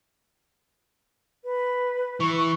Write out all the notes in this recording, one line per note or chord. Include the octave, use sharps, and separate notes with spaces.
B4
E3 C#6